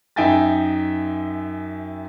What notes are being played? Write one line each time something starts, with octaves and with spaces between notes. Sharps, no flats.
F#2 D#4 E5 G5 G#5 A6